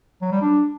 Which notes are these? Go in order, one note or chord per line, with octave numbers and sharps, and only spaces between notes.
F#3
G3
D4